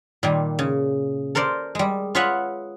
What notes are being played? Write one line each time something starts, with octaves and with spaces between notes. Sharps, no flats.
A#2 D#3 G3
C#3
A4 A#4 C5 D5
G3 G#3
F4 G#4 B4 C#5 E5 F#5